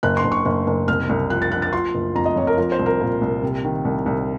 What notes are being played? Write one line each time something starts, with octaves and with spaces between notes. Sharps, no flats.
F#1 F#6
C6
F#1
C#6
F#1
F#1
C2 F6
C2
F3 F#6
A6
F3 F#6
A6
F3 C6
F#1
F2 A#5
D#5
F2 C#5
A#4
F3 A#4
C5
C2
A#4
A#2
C2
C3
D#3
C2
C2